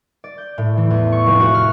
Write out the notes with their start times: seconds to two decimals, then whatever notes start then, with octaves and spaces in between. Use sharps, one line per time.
0.24 D5
0.38 G6
0.58 A2
0.77 E3
0.90 E2
1.12 C#6
1.27 F1
1.40 F#4
1.54 F6